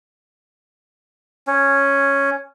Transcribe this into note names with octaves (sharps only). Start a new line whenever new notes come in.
C#4